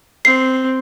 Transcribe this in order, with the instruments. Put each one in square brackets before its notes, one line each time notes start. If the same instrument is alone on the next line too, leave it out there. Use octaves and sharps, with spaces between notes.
[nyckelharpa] C4 [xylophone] C7